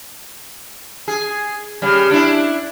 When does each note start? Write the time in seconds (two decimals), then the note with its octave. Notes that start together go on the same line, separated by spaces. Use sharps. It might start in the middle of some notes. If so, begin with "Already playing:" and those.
1.08 G#4
1.82 C#3 G3
2.11 D4 E4